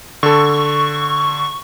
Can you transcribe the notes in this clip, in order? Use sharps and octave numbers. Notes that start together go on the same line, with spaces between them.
D3 A4 C#6